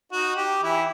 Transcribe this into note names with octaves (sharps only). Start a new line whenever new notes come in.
D#4 F#4
G4
E3 E4